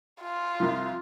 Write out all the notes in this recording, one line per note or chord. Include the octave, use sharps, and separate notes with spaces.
F4
C2 F3